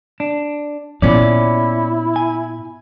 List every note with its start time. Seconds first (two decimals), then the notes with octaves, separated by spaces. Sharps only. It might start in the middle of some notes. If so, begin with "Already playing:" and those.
0.20 D4
1.02 A#2 B3 C#4 E4 D5
2.16 G#5